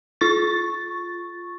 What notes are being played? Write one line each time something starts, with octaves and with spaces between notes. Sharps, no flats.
F4 C#6 A6